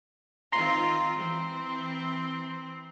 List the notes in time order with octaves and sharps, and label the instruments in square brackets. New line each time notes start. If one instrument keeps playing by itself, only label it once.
[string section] D#3 C4 F4 [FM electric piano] A#5 C6
[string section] E3 C4